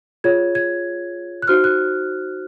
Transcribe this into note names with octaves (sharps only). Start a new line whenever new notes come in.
F4 G#4 C#5 G#6
G#6
F#6
D#4 F#4 C5 F6
F#6